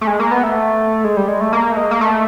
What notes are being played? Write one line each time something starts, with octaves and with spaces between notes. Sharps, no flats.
A3
G#3
A#3
B3
A3
G#3
G3
G#3
A3
A#3
A3
G#3
A#3
A3